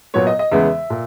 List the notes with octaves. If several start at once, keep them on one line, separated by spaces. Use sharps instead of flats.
A#2 F#3 B3 C#5
D#5
D#5
E2 C#3 G#3 B3 E5
A#2